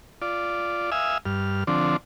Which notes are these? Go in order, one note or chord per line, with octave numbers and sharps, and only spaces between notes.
F4 D5
E5 F5 G#5 D#6 E6
G2 F6
D3 F3 C4 D4